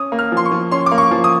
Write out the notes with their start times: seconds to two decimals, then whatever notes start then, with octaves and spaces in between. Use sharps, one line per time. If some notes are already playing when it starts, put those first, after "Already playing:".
Already playing: C#4 D#6
0.12 A#3
0.19 F6
0.32 F3 C6
0.45 C#6
0.52 F3
0.71 C#4 C6
0.86 D6
0.91 A#3
0.98 C#6
1.11 F3
1.24 D#6